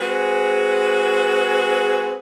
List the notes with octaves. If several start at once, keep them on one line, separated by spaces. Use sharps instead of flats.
G#3 C4 F#4 G#4 B4